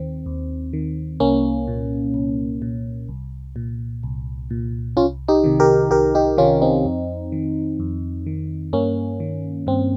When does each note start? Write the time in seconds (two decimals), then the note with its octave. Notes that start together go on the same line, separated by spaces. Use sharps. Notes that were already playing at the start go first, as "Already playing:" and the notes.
Already playing: D#2 D#3 C4
0.26 D#2
0.73 D#3
1.20 C2 A#3 C#4
1.68 A#2
2.14 C2
2.62 A#2
3.09 C2
3.56 A#2
4.03 C2
4.51 A#2
4.97 C2 C#4 F4
5.28 D#4 G4
5.44 C3 D#3
5.60 G4 A#4
5.91 C2 G4 A#4
6.15 D#4 G4
6.38 C3 D#3 C#4 F4
6.62 C4 D#4
6.85 F2
7.32 D#3
7.80 F2
8.26 D#3
8.73 G2 A#3 C#4
9.20 D#3
9.67 G2 C4